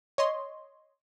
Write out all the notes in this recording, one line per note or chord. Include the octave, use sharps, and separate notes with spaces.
C#5 D#5 C6